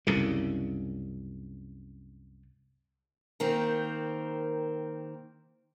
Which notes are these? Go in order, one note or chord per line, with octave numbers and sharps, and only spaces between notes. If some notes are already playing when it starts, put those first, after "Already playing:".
C2 F#2 C#3
D#3 A#3 C4